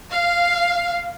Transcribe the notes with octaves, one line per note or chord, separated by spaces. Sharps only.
F5